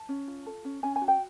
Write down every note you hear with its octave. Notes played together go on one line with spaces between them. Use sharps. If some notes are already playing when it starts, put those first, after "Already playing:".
Already playing: A5
C#4
F4
A4
C#4
C#4 G#5
G#5
F#4
G5